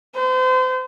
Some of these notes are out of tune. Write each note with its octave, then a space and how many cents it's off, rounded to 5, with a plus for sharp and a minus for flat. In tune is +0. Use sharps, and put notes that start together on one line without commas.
C5 -35